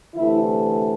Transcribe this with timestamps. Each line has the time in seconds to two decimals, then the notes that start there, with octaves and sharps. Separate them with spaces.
0.15 D2 C3 E3 A3 E4